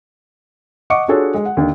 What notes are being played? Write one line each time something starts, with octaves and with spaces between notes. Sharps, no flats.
D#5 F#5 C#6 D6 C#7
D4 F4 F#4 G#4 A4 C#5
G#3
F#5
D#2 D3